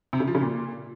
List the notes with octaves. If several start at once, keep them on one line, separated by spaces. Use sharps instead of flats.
C3
C#3
F3
C#3
A#2